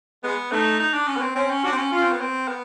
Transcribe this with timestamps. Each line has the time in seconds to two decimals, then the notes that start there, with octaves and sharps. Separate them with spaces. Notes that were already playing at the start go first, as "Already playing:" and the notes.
0.23 G#3 B3
0.52 A3 D#4
0.80 D#4
0.93 D4
1.07 C#4
1.16 B3
1.21 C4
1.35 C4 C#4
1.50 C#4
1.64 D4 F#4
1.72 C4
1.78 C#4
1.92 C#4 F4
2.02 C4
2.12 B3
2.21 C4
2.48 B3